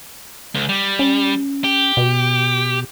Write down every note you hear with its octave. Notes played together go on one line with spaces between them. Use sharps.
C#2
G3
C#4
G4
B2